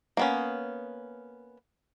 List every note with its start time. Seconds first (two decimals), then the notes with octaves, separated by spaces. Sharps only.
0.17 A#3 B3 C#4